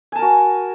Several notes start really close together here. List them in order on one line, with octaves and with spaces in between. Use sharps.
G#5 A5 A#4 F#4